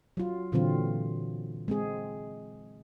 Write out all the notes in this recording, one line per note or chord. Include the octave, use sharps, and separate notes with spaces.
F#3 F4
A#2 D3 E3 F#3 C4 F4
G#3 C4 G#4